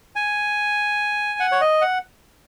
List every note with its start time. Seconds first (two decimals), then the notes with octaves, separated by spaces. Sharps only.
0.16 G#5
1.40 F#5
1.52 C#5
1.61 D#5
1.81 F#5